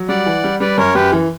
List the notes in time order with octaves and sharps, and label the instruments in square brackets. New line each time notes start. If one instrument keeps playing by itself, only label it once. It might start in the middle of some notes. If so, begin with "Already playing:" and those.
Already playing: [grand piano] F#3
[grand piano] G3 [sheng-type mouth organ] D5 F#5
[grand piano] E3
G3
[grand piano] G3 [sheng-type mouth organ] B4 D5
[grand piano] F#2 [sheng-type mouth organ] A#4 C#5
[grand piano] F#2 [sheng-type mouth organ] G4 B4
[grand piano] E3